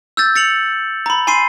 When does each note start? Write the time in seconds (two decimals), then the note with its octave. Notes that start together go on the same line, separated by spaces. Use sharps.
0.17 E6 G6 A6
0.36 A6 C#7 F7 F#7
1.06 A#5 B5
1.27 G#5 B5 C6 C7 D#7